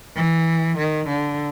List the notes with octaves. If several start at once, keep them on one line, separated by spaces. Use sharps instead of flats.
E3
D#3
D3